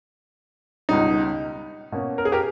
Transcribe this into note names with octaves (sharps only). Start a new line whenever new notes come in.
C#2 B2 G3 D#4
B2 A#3 C#4
A#4
G#4
G4 A#4